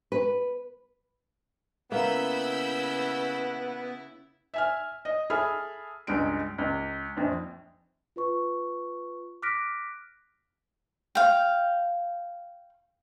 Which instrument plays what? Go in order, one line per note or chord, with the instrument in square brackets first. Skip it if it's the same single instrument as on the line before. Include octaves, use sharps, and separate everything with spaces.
[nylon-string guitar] B4
[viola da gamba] C#3 E4 [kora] A#3 [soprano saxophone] B3 [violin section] B5 E6 G6
[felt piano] E5 G#5 F6
D#5
G#4 A4 E5 B5 F6
C#2 G2 G#3 D7
C#2
A#1 F2
[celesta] F4 B4 C#6
D6 F6 F#6 A#6 B6 D7
[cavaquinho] F5 G5